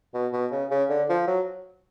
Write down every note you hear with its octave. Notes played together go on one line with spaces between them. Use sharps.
B2
B2
C#3
C#3
D3
F3
F#3